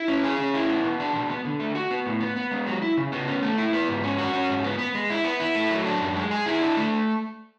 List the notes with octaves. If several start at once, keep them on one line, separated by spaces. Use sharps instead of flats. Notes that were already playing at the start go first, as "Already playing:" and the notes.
Already playing: E4
C#4
G#4
C#4
E4
B3
B2
D4
B2
B3
D3
A3
F#4
B3
A2
B3
B3
G#3
F#3
E4
C#3
B3
C#4
A3
E4
B3
G#2
C#4
F#4
C#4
G#2
B3
B3
G#3
E4
B3
E4
A3
F#3
D4
F#2
G#3
G#4
E4
D4
A3